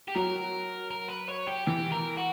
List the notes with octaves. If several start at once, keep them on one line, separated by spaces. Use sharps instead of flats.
G4
F#3 A#4
A#4
B4
C#5
G4
E3 G4
A#4
F#4